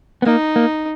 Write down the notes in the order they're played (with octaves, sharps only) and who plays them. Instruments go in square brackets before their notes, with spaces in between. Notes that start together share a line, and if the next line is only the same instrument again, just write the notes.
[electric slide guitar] B3
[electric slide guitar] A#3 [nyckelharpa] D#4
[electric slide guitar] A#3